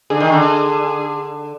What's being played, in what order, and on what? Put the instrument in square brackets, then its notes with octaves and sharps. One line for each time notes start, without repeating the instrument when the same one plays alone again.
[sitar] D3 [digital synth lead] G#4
[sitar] D#3
D3